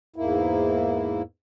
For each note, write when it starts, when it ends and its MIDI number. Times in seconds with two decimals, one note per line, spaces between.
0.16 1.22 40
0.16 1.22 44
0.16 1.22 58
0.16 1.22 64